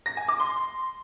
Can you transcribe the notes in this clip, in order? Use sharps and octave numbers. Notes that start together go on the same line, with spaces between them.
A#6
G#5
D6
C6